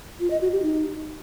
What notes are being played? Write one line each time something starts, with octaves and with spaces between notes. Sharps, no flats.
F4
D#5
F#4
G4
D#4